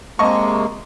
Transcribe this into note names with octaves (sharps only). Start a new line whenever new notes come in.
C3 G#3 A#3 D#5 A5 C#6